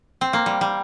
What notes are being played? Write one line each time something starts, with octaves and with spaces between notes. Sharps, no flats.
C4
A#3
G3
G3